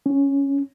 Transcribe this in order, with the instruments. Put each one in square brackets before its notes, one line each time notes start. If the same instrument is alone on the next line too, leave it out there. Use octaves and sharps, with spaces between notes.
[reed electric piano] C#4